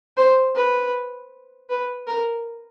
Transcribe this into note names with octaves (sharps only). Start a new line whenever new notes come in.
C5
B4
B4
A#4